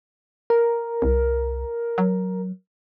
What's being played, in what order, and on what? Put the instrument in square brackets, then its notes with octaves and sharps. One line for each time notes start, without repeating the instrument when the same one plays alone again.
[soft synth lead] A#4
[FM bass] C2
F#3